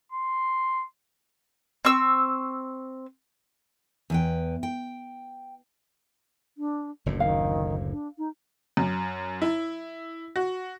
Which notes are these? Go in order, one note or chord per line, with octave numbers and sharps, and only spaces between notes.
C6
C4 C#6 E6
E2 B4 G5
G5
D4
F#1 D2 A2 F#3
D#3 F5
D4
D#4
F#2
E4
F#4